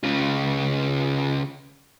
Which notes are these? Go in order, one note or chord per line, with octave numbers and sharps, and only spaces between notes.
C#3 F4